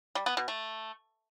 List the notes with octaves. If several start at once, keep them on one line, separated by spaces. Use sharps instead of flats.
G3
B3
B2
A3